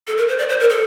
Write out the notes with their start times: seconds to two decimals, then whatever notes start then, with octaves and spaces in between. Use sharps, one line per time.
0.07 A4
0.17 A#4
0.28 C5
0.39 D5
0.49 C5
0.60 A#4
0.70 A4